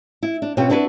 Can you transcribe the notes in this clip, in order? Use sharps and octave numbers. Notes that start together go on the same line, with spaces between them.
E4
D4
B2 C4 C#4 F4 F#4 G5
C4 D4 E4 F#4 B4